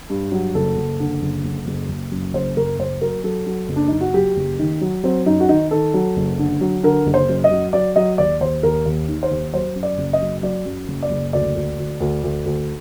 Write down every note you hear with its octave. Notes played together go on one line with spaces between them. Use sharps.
G2
F#3
F#1 A4
F#1
D3
F#1
F#1
F#1
F#1
F#2
F#1 C5
F#1 A#4
F#1 C5
F#3 A#4
F#3 A4
F#3
F#1
D4
F#1 D#4
F#4
F#3 G4
F#1
D#3
F#3
F#3 C4
F#2 D#4
F#4
D#3 D#4
D#3 A4
F#3
F#1
D3
F#3
D3 A#4
F#1
C5
F#2
D#5
F#3
F#3 D5
F#3 D#5
D#2 D5
D#2 C5
D#2 A#4
D#2
D#3
C5
D#2
F#3 C5
F#2
D5
F#1
D#5
F#3
F#3 D5
F#2
F#1
D5
F#1
D2 D5
D2
D2
D2
D2
D2